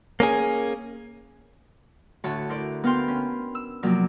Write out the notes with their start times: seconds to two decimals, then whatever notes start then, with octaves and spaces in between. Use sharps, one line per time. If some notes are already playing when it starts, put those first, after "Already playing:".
0.20 A#3 C#4 G#4
2.24 D2 A2 F#4 C#5 A5
2.49 E4 A#4 C5 D5
2.84 B3 A#4 F5 G5 C6
3.08 C#4
3.55 E6
3.83 C3 F3 F#3 A#3 A#4 D5